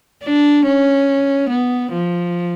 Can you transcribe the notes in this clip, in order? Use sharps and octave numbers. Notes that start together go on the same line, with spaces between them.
D4
C#4
B3
F3